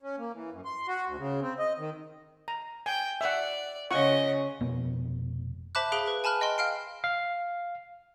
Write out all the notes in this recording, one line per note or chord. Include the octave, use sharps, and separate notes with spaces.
C#4
A#3
E3
F#2
C6
F#4
D2
C#3
C4
D#5
D#3
A#5
G5 G#5
D5 E5 F#5
C#3 F4 D#5 F#5 C#6
F1 B2 A#3 B3
C5 E5 A5 B5 D6 F#6
G#4 F5 B5 F#6 D7 G7
B4
G#5 A5 B5 F6 F#6
D#5 G5 C6
F5 G5 F6 C7 D7
F5